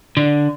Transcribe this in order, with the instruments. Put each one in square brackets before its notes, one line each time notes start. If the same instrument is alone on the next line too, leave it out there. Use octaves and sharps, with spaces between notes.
[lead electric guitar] D3